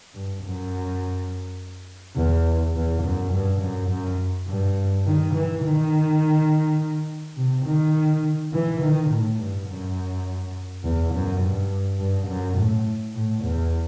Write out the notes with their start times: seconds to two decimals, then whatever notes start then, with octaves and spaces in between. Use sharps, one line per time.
0.14 G2
0.43 F#2
2.16 E2
2.75 E2
3.03 F#2
3.32 G2
3.61 F#2
3.90 F#2
4.47 G2
5.05 D#3
5.34 E3
5.63 D#3
7.37 C3
7.66 D#3
8.53 E3
8.81 D#3
9.10 A2
9.39 G2
9.68 F#2
10.83 E2
11.13 F#2
11.41 G2
11.99 G2
12.27 F#2
12.57 A2
13.15 A2
13.43 E2